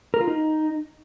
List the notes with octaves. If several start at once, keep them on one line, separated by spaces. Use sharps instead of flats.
A#4
F4
D#4